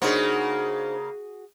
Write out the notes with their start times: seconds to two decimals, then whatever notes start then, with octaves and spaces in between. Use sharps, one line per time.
0.02 C#3 A#3 D4 D#4 F#4 G#4 C5